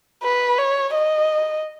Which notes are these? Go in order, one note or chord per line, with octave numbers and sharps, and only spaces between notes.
B4
C#5
D#5